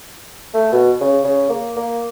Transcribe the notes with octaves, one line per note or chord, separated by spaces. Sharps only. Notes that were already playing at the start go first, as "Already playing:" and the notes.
A3
B2
C#3
C#3
A#3
A#3